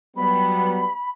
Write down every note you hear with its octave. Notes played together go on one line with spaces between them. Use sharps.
F#3 G3 B3 B5